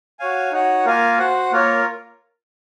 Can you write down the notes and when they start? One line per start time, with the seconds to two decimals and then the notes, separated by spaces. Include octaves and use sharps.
0.19 F#4 C#5 F5 G#5
0.51 D#4 F#4 C#5 F#5
0.86 A#3 F4 A#4 F5 G#5
1.18 F#4 C5 F#5
1.52 A#3 F4 A#4 C#5